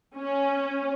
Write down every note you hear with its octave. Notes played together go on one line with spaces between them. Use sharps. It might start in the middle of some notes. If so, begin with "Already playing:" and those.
C#4